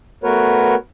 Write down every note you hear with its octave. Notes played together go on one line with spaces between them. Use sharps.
A3 B3 F#4 A#4 B4 C#5